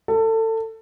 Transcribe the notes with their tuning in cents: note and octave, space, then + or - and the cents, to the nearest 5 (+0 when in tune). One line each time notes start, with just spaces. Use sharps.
A4 +25